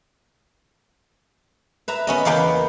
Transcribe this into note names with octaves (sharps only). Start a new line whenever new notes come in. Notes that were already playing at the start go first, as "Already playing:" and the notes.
B4 E5 A#5
B3 C#4 D#5
E2 C#3 A#3 B3 B4 G5